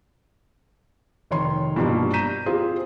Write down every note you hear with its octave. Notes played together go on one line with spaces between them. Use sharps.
F1 D#3 C#5 C6
G2 B2 F3 A#3
A#5 G6 B6 D#7 E7
C4 F4 G4 G#4